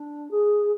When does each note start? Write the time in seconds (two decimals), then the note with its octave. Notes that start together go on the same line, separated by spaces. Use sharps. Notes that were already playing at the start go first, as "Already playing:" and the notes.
Already playing: D4
0.31 G#4